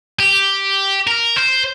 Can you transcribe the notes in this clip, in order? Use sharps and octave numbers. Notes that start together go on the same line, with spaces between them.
G4
A#4
C5